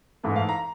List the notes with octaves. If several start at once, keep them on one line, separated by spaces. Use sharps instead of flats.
G#2 E3 A3
F5
A#5